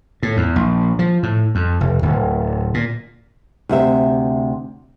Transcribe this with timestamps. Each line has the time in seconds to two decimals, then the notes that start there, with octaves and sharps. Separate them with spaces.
0.23 A2
0.37 E2
0.56 A#1
0.99 F3
1.23 A2
1.55 F2
1.80 F1
2.02 D1
2.74 A#2
3.69 D2 C3 E5